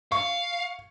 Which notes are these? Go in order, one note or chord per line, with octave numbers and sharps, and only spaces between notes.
F5 C#6